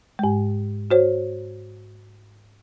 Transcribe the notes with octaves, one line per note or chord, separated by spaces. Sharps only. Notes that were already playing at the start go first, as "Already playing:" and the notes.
G#2 G#3
F#4 C5 C#5